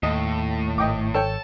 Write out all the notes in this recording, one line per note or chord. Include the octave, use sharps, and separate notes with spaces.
D#2 A2 D#5
D1 G#1 D#5 G5 D6
A4 C#5 G5 A5